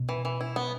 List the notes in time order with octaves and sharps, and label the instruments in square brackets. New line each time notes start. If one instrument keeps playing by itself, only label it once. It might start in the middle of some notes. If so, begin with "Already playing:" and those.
Already playing: [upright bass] B2
[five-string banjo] E3
E3
E4
B3